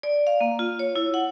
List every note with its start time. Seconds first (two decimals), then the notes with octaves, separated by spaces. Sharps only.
0.03 D5
0.27 F5
0.41 A#3
0.59 F4
0.79 C#5
0.96 E4
1.14 F#5